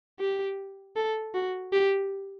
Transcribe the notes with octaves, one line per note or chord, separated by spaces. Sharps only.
G4
A4
F#4
G4